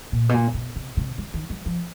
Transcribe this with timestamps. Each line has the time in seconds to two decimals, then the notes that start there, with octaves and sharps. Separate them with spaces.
0.12 A#2
0.29 B2
0.34 A#2
0.54 B2
0.76 C3
0.97 C3
1.18 D3
1.34 D#3
1.50 F#3
1.66 F3